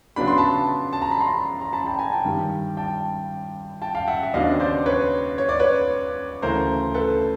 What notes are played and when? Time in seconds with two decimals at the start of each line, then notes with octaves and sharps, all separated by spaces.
0.16 C#3 F#3 B3 D4 B5
0.27 C6
0.38 A5 B5
0.93 A5
1.02 A#5
1.11 B5
1.20 A#5 C6
1.61 A#5
1.73 A5 B5
1.86 G5 A5
1.99 G#5 A#5
2.12 G5 A5
2.25 G2 D#3 G3
2.77 G5 A5
3.82 G5 A5
3.95 F5 G5
4.08 E5 F#5
4.23 E5
4.34 D#2 C#3 F#3 B3 D4 D#5 F5
4.60 C5 D5
4.86 B4 C#5
5.38 C#5
5.49 D5
5.59 B4 C#5
6.42 D2 C#3 E3 A3 A#4 C5
6.95 A4 B4